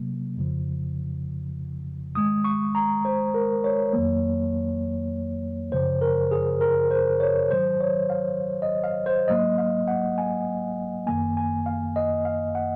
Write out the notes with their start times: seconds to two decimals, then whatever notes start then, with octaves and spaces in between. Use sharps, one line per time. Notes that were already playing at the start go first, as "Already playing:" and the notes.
Already playing: C3 F#3 A#3
0.36 F2 C#3 F3
2.15 G#2 D#3 G#3 D#6
2.44 C#6
2.75 A#5
3.05 C5
3.34 A#4
3.64 C#5
3.93 F2 D#3 F#3 A#3
5.72 F#2 C#3 F3 C5
6.01 A#4
6.31 G#4
6.61 A#4
6.91 C5
7.20 C#5
7.51 G#2 D#3 F#3 C5
7.80 C#5
8.10 F5
8.62 D#5
8.84 F5
9.06 C5
9.28 G#2 F#3 A#3 D#5
9.58 F5
9.88 F#5
10.18 G#5
11.07 F#2 D#3 A#3 G#5
11.37 G#5
11.66 F5
11.96 D#5
12.25 F5
12.55 F#5